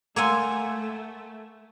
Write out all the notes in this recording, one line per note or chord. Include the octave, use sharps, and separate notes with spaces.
A3 A#3 F#5 G#5 C6 E6 G#6